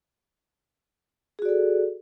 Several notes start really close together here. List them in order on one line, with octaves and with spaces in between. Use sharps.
G#4 F#4 D5 A4